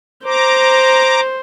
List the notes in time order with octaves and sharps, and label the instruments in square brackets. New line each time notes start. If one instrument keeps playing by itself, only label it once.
[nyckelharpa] C5 [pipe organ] A#5 D6